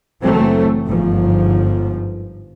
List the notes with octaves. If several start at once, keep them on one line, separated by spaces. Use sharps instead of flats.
F#1 E3 F#3 A3 C4
G1 G#2 F3